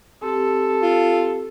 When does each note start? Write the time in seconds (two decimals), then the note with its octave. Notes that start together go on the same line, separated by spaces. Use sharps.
0.23 C4 G4 A4
0.82 F4